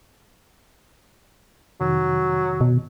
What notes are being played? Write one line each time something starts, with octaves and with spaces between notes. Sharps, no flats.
F2 C3 D#3 F#3
B2